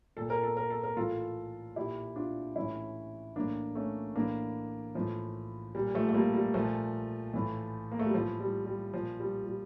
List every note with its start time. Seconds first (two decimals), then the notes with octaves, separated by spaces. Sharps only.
0.17 A#2 A4
0.30 A#4
0.43 A4
0.57 A#4
0.70 A4
0.83 A#4
0.96 A2 E3 F4 A4
1.76 A#2 E4 G4
2.16 D4 F4
2.56 A2 E3 C#4 E4
3.36 A2 E3 A#3 D4
3.75 A3 C#4
4.15 A2 E3 A#3 D4
4.95 A2 E3 F3
5.75 A#2 G3
5.94 F3 A3
6.09 A3
6.14 G3 A#3
6.34 G3
6.54 A#2 F3 A3
7.34 A2 E3
7.92 A#3
7.99 A3
8.06 G3
8.13 A2 E3 F3
8.40 G3
8.66 G3
8.93 A#2 F3
9.20 G3
9.47 G3